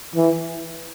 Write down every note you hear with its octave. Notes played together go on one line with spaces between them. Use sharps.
E3